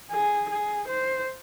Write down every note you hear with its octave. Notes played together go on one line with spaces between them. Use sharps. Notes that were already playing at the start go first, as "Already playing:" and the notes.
G#4
G#4
C5